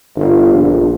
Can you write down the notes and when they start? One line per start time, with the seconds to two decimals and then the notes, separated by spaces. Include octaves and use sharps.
0.16 G1
0.52 A#1